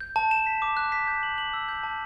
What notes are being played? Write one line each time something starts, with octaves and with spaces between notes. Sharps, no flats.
G6
A5
E7
B6
D6
F#6
B6
G6
F#7
F#7
E6
G6
A5